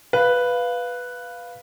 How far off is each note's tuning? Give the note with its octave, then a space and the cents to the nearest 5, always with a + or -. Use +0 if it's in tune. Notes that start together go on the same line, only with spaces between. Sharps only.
B4 +0 F5 +0